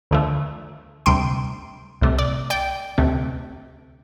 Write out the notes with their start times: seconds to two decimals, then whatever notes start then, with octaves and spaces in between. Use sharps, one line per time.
0.11 D2 D3 F3 A3
1.06 D2 C3 G3 G5 C6
2.01 C2 C3 A3
2.19 D5
2.50 D5 G5
2.98 D2 C3 A3